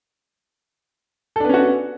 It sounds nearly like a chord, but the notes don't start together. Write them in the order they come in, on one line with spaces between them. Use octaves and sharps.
A4 D4 B3 C#4 F#4